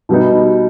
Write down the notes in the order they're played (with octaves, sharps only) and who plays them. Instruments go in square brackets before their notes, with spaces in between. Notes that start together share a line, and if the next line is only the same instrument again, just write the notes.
[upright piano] B2 G3 B3 D#4